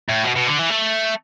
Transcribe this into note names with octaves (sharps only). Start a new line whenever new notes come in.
A2
B2
B2
D3
E3
A3